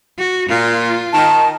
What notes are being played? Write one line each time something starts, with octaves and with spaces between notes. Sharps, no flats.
F#4
A#2 F4
D#3 A5